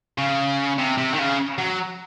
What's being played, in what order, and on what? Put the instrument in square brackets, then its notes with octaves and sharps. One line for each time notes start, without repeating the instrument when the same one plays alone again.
[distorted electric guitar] C#3
C3
C3
D#3
C#3
F#3